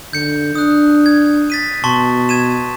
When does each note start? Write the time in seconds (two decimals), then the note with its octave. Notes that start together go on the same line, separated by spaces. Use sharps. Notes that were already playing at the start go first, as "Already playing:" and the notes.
0.13 D3 G6 C#7
0.55 D4 D#6 F#6
1.06 G#6
1.50 A6 B6 D#7
1.84 B2 A5 C6 C#6
2.29 G#6 D#7 E7